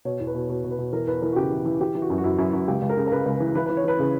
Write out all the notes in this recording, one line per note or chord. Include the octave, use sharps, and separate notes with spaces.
B2 C#5
E2
B4
B2
B2
B2
B4
B2
E3 A#4
E2 B4
E3 A#4
F#4
C#3 G4
E3
E3
E3 G4
E3
F#4
F#2
F#4
F#2 E4
F#2 E4
F#2 F#4
C#2 G4
C#2
A#4
C#3
A#4
C#3 B4
C#2
E3
E3 B4
E3 B4
C#5
E3 B4
C#3